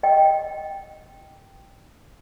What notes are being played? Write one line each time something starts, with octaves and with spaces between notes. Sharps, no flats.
D#5 G5